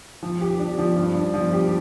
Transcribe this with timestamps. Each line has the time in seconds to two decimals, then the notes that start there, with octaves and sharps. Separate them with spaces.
0.23 F3
0.41 G4
0.59 D4
0.78 F3
0.96 G2
1.15 D4
1.34 F3
1.53 G4